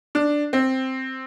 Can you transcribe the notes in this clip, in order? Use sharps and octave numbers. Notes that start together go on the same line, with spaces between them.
D4
C4